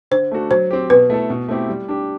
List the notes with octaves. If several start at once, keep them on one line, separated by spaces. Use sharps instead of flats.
D3 C5
A3 D4 F#4 A4
F#3 C5
C4 G4
B2 B4
A3 E4 A4
B2
A3 C4 E4 G4
G3
D4 G4